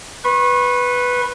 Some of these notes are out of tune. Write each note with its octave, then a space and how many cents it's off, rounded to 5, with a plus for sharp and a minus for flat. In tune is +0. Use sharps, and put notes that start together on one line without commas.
B4 +0 C#6 -40